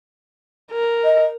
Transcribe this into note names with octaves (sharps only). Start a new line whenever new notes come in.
A#4
D#5